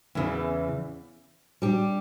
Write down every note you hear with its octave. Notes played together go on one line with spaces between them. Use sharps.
E2 C#3 E3
G3 D4 G4